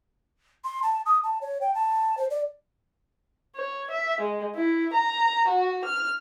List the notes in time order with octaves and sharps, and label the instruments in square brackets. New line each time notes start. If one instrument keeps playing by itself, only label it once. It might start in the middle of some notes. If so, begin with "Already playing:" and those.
[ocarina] C6
A5
D#6
A5
C#5
G5
A5
C5
D5
[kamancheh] C#5
E5
G#3
E4
A#5
F#4
F6